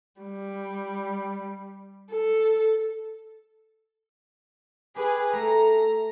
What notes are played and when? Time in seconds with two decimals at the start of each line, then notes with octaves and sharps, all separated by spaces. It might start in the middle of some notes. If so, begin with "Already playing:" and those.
0.21 G3
2.10 A4
4.96 G4 G#4 B4
5.33 A3 A#5